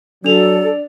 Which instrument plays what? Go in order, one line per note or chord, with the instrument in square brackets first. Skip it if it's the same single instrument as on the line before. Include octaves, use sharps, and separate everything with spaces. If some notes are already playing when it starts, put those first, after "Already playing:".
[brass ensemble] F#3 [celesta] D4 F7 [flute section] A4 [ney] D5